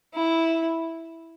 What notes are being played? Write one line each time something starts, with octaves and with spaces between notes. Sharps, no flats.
E4